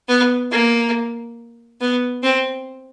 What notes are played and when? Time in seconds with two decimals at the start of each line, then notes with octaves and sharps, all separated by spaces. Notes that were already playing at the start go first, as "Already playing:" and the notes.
0.08 B3
0.51 A#3
1.81 B3
2.23 C4